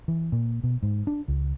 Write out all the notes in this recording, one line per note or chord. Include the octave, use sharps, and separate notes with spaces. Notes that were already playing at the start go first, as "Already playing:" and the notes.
E3
A#2
B2
G#2
D4
C#2